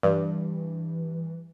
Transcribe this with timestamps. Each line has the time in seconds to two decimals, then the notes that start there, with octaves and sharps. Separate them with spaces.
0.03 G2 E3